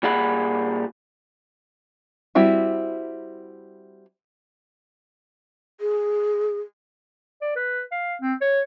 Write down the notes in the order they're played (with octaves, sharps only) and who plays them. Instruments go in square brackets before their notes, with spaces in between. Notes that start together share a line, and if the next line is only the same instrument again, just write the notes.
[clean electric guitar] A#2 G3 G#4 F#5 B5
[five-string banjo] G3 C4 E4 F#4
[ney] G#4
[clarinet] D5
B4
F5
C4
C#5